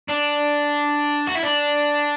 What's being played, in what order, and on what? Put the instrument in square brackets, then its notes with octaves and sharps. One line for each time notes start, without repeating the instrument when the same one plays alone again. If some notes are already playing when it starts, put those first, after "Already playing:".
[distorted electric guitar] D4
F#4
E4
D4